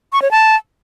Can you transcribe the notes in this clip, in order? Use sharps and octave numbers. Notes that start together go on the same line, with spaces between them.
C#6
C#5
A5